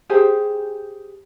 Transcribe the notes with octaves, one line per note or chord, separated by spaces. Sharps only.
G4 G#4 C5 G#5